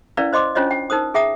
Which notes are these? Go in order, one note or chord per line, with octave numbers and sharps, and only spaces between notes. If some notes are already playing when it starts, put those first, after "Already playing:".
C#4 E4 A#4 B4 D5 F5
C5 D#5 C6 D6
C#4 D4 F4 C5 C#5 D#5
G5
D#4 A#4 C5 D#6
G#4 E5 G5 A#5 D#6